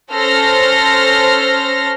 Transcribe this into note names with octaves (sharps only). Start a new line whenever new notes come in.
C#4 A4 C5 F6 A#6